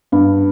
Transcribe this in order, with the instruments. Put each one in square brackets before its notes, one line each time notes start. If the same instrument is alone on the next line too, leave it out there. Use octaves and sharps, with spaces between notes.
[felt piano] G2